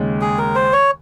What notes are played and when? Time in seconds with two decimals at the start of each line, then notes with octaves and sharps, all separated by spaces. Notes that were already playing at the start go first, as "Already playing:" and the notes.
Already playing: D#2 C#3 G#3
0.21 G#4
0.38 A#4
0.55 C5
0.73 C#5